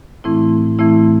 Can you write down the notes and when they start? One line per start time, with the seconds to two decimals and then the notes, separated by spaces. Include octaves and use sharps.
0.24 A2 E3 A3 C4 E4
0.79 A2 E3 A3 C4 E4